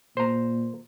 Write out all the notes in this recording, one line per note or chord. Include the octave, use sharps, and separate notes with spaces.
A#2 C5 A#5